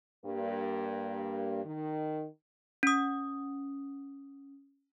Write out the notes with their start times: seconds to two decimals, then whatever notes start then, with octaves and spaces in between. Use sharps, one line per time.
0.24 G2 A#3
1.65 D#3
2.83 C#4 D#6